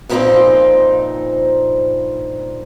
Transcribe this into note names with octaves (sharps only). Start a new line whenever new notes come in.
G2 A#2 F3 B3 C4 D#4